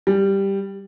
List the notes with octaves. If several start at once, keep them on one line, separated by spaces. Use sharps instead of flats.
G3